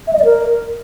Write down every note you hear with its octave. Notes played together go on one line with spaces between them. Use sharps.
E5
D#5
D5
A#4